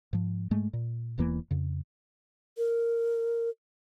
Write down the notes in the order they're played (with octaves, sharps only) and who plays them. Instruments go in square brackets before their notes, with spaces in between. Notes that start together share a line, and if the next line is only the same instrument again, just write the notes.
[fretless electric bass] G#2 F3
G#2 G#3 A3
A#2
E1 E2 E3 A#3
F2 C#3
[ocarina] A#4